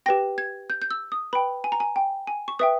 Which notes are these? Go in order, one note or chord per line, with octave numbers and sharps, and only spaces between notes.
G4 B4 G5 A#6
G#6
G6
G6
E6
D#6
B4 G5 B5
G#5
A#5
G#5
G5
G#5
C#6
B4 E5 G5 D#6